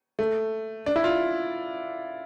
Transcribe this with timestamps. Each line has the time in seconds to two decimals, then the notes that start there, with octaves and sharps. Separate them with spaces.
0.19 A3
0.86 D4
0.96 E4
1.04 F4